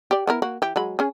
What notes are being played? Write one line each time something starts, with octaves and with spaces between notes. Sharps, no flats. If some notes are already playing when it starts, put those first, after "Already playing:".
G4 D5
B3 E4 A#4
A#3 F#4
E3 G4
F#3 G#3 B5
C#4 G#4